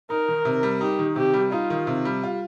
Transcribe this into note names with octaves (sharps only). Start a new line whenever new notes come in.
D#4 A#4
D#3
C3
G3
D#4 G4
D#3
C3 G4
G3
D#4 F4
D#3
C3
G3
F4